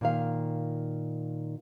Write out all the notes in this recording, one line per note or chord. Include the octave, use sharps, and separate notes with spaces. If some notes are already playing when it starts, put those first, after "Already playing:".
A#2 D#3 F5